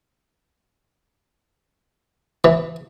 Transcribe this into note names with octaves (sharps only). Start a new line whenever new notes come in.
E3